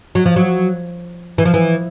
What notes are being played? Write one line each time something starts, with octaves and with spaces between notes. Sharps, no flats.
F#3
F3
F#3
E3
F3
E3